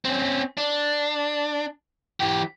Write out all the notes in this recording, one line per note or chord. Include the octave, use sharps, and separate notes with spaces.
C4 C#4
D4
E3 G4